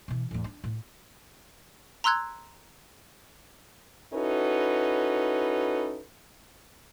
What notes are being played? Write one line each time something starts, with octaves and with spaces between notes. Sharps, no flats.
B2 E3
E2 A2
D4
A2
A#5 C6 E6 F#6 G#6
C#4 D#4 E4 F#4 A4 B4